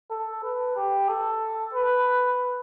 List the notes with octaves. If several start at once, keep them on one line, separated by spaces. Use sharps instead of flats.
A4
B4
G4
A4
B4